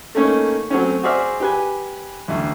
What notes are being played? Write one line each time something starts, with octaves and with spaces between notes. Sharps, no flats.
A3 A#3 C#4 D#4
F#3 A3 C4 C#4
F#4 G#4 C5 D5 E5 F6
G4 B4 G#5
A1 D2